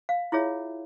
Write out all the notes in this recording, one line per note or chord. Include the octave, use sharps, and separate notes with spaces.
F5
E4 F4 G#4 C#5 E5